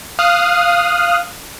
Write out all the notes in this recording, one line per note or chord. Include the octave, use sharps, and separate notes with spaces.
F5 D#6 F6 F#6